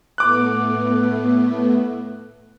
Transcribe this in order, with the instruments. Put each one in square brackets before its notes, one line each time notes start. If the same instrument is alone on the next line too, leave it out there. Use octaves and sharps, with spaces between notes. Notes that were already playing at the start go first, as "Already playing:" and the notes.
[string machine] A2 A3 B3 [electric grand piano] D6 F#6